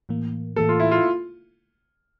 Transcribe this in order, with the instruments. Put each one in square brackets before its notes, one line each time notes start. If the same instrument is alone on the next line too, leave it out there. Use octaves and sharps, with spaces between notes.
[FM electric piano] A2 E3 A#3
[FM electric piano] A2 E3 A#3 [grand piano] A4
[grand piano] F4
E4
F4